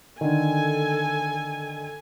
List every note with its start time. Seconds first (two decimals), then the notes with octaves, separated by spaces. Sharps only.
0.21 D3 D#3 A4 G#5